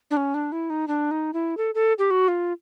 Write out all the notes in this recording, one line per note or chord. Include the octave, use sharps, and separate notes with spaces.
D4
C#4
D4
E4
D#4
D4
D#4
E4
A4
A4
G4
F#4
F4